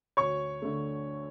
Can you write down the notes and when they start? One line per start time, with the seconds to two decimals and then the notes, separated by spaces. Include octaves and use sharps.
0.17 D2 C#5 C#6
0.62 D3 A3